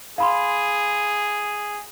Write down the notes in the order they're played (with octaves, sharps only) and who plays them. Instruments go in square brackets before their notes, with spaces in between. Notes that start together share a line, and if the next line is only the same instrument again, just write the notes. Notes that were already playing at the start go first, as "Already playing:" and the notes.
[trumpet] G#4 [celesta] F5 B5 C6